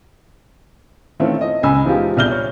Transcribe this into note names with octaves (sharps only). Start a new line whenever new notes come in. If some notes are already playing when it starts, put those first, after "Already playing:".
D#3 E3 A3 C4 C#4 F4
D#5
C#2 G#5 B5 E6
E3 F3 G#3 D#4 F4 G4
G1 C2 D5 F6 G6 G7
C#5